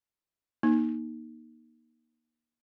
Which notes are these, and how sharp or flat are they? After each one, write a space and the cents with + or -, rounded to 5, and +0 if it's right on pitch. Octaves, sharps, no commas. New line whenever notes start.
A#3 +30 D#4 +0